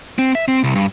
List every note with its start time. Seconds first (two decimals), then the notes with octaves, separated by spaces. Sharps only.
0.18 C4
0.35 E5
0.48 C4
0.64 C2
0.75 G2